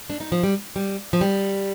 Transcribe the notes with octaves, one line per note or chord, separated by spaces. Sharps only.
D4
D#4
F3
G3
G3
F3
G3